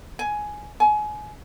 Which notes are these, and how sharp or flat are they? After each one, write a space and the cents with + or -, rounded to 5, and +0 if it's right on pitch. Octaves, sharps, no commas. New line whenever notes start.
G#5 +10
G#5 +30